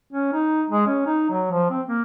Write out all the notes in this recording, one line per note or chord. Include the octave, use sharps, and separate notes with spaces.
C#4
D#4
G#3
C#4
D#4
F#3
F3
C4
A#3